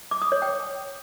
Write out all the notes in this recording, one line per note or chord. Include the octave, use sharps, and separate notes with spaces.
D6
D#6
C#5
G5